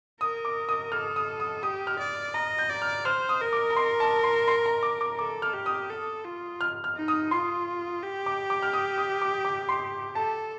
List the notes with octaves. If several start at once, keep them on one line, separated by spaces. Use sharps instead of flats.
A#4 D#6
D6
D#6
A4 F6
D#6
D#6
G4 D#6
F6
D5
D#5 A#5
G6
D5
F6
C5 F6
D#6
A#4
D6
A#5
C6
A5
C6
C6
A#5
D6
D6
A4 D6
F6
G4
D#6
A4
F4
F6
F6
D#4
D#6
F4 C6
G4
D6
D6
F6
D#6
D#6
D6
D6
C6
A4 A5